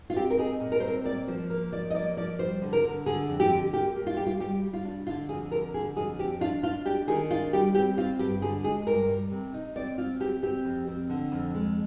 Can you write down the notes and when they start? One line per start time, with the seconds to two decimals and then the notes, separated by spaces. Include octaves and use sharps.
0.10 F4
0.16 C4 G4
0.30 A#4
0.38 D#4 G#4
0.61 A#2
0.72 A#4
0.80 C5
0.84 C4 A#4
1.05 A#3 D5
1.28 F3 C5
1.50 A#3 A#4
1.73 F3 D5
1.90 D#5
1.94 A#3 D5
2.17 F3 D5
2.39 G3 C5
2.62 D3
2.73 A#4
2.84 D3
3.06 D3 G#4
3.29 F2
3.40 G4
3.51 D3
3.73 A#3 G4
3.96 A#3
4.07 F4
4.17 G3 G4
4.26 F4
4.40 G3 G4
4.62 G3
4.73 F4
4.85 D4
5.07 D3 F4
5.29 F2 G#4
5.51 D3 A#4
5.74 D3 G#4
5.96 F2 G#4
6.19 C4 G4
6.41 D4 F4
6.63 D4 F4
6.86 D4 G4
7.08 D#3 G#4
7.30 D4 F4
7.53 G3 G4
7.75 C4 G4
7.97 C4 F4
8.19 G2 G4
8.42 D3 G#4
8.64 G#3 G#4
8.87 G2 A#4
9.09 G3
9.31 C3
9.54 D#4
9.75 C4 D5
9.98 C4 F4
10.20 C4 G4
10.43 C4 G4
10.65 F2
10.87 C4
11.10 D3
11.32 F2
11.54 G#3